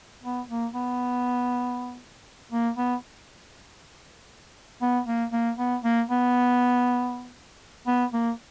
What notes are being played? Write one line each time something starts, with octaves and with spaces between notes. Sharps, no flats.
B3
A#3
B3
A#3
B3
B3
A#3
A#3
B3
A#3
B3
B3
A#3